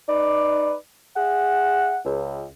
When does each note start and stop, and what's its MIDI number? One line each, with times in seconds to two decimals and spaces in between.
0.08 0.73 63
0.08 0.73 71
0.08 0.73 74
1.16 1.98 68
1.16 1.98 76
1.16 1.98 78
2.05 2.46 37